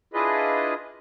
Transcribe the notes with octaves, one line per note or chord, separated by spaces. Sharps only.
D4 E4 F4 G#4 B4 D#5